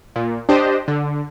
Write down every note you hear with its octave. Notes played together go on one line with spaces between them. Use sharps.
A#2
D4 G4 C5 D#5
D3